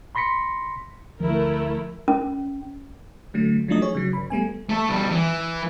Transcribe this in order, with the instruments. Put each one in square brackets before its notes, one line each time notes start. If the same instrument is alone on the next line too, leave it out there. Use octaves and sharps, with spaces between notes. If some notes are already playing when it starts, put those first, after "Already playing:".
[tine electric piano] B5 C6 A#6 B6 C#7
[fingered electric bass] D2 F3 [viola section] A3 E4 A#4
[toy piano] C#4
[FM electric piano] D3 F#3 A3
F3 F#3 A3 D4 D#4 D#5
G#4 C#5
C#3 F#3
G1 B5
G3 A3 B3 G#5
[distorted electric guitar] A3 A4
B2 G3
E3